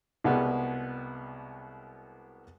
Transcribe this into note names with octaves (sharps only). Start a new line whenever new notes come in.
C2 B2 G3 G#3 B3